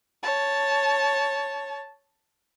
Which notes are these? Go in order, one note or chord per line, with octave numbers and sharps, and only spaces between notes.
C#5 A5